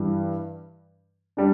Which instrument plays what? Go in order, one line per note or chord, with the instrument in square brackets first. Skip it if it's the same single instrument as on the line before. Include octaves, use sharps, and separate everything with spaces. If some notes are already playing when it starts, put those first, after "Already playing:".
Already playing: [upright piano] G2 E3 G3
G3 D4